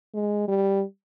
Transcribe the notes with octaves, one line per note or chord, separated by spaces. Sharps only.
G#3
G3